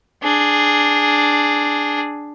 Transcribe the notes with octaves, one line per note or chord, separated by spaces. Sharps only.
D4 G#4